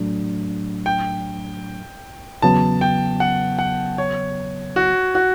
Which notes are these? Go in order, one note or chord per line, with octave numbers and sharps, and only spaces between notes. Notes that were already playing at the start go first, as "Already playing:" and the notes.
Already playing: A2 F#3 A3 D4
G5
E2 C#3 F#3 B3 A5
G5
F#5
F#5
C#5
F#4
F#4